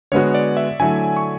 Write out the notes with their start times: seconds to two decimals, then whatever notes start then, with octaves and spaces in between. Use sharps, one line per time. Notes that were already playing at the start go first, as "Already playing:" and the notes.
0.12 D3 G#3 B3 F#4 C#5
0.34 D5
0.57 E5
0.79 D3 F#3 A3 E4 G#5
1.17 C#6